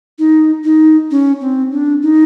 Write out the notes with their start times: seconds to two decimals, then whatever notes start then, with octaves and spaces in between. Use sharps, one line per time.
0.19 D#4
0.64 D#4
1.11 C#4
1.41 C4
1.72 D4
2.02 D#4